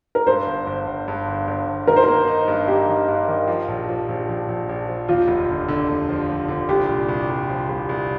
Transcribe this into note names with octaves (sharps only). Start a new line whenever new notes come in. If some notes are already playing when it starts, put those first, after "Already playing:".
A#4
G2 C5
G1
G1
G1
G2
G1
G1
G1
D#3 A#4
C5
A#3 A#4
D#4
G2
A#3 G4
D#3
G2
D#3
F3
A#1
F3
A#1
A#1
A#1
A#1
F3
D#2 F4
F1
D3
D3
F1
F3
F1
D3
C2 G4
A#2
C2
C2
F3
C2
C2